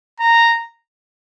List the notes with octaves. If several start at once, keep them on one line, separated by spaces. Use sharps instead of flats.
A#5